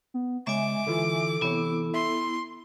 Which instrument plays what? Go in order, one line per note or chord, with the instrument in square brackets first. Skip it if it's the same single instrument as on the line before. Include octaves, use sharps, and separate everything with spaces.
[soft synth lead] B3
[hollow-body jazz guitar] C#3 [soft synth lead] G#3 [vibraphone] E5 G#5 [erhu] D6
[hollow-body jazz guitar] D3 E3 F4 [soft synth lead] A4
[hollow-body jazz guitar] C3 E3 C#5 [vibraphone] B3 E4
[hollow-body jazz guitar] E5 [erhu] C6